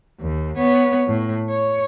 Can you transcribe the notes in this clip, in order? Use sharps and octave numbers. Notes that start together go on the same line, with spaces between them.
D#2
B3 C#5
A2
C#5